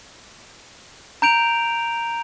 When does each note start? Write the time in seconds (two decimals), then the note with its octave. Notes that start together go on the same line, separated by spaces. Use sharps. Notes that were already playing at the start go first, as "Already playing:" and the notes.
1.22 A#5 G6 D7 F7